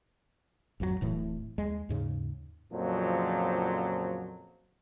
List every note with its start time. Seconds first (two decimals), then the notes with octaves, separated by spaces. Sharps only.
0.80 G#1 F2 E3 F#3
1.01 D1 A2 E3 A3
1.58 D#2 G#3
1.89 D#2 G#2 C#3
2.72 F2 A#2 C#3 F3 F#3